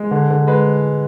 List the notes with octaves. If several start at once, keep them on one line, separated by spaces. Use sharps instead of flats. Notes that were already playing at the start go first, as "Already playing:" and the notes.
Already playing: G#3
D3
D3
G#3 B4